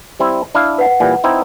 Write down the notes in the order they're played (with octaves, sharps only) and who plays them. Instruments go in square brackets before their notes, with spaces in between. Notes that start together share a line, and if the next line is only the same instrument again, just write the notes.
[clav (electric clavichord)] G3 C4 E4
D4 E4 F5
[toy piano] B4 F#5
[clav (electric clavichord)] A#2 E3 G3
C4 D#4 E4